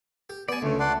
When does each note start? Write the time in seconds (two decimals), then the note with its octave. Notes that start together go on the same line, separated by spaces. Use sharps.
0.30 G4
0.49 B3 D5 G#5 A5
0.62 C#2 D3 A3 C#4
0.80 F4 D5 F#5 A5 C6